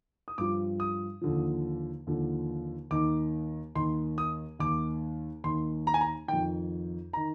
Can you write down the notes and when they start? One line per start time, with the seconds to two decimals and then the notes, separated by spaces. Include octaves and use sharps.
0.28 D#6
0.38 G2 F3 D6
0.80 D#6
1.21 D#2 D3 F3
2.07 D#2 D3 F3
2.91 D#2 D#3 D6
3.75 D#2 D#3 C6
4.18 D#6
4.59 D#2 D#3 D6
5.44 D#2 D#3 C6
5.87 A#5
5.94 G#5
6.01 A#5
6.28 D#3 G5
6.33 F2
7.13 D#3 A#5